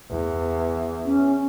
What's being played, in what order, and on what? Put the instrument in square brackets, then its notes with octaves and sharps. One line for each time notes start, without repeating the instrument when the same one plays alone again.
[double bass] E2
[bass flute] C#4